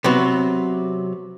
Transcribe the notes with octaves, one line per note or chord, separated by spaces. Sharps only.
C3 F#3 B3